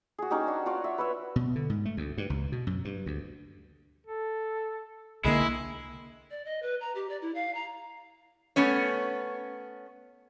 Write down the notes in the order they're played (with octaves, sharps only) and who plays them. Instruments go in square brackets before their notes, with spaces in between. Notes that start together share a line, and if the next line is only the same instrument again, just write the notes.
[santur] F#4 G#4
C#4 D#4 F#4 G4
D4 F#4
F4 F#4 C#5 D5
E5
B4 C#5 E5
[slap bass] B2
D3
G#2
A3
D2
G2
C#2
B2
F#2
G2
D2
[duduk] A4
[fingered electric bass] C2 D3 A#3 [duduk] D#3 [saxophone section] G#3 [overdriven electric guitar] E4
[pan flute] D5
D#5
B4
A#5
G4
D5
E4
F5
A#5
[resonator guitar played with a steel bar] A3 B3 C#4 C#5